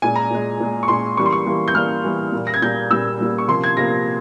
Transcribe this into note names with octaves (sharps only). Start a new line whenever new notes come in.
A#2 G#3 G#5
A#5
A#2 G#3
A#2 G#3
C#6
A#2 G#3 C6
E3 G3 A#3 C#6
C6
C#6
E3 G3 A#3
G6
E3 G3 A#3 F6
E3 G3 A#3
A#2 G3 A#3
A#6
G#6
A#2 G3 A#3 G6
A#2 G3 A#3 E6
A#2 G3 A#3
C#6
C3 F3 A#3 C6
G#6
C3 F3 A#3 A#6